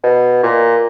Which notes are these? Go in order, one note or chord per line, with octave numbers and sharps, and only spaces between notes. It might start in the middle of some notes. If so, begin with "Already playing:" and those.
B2
A#2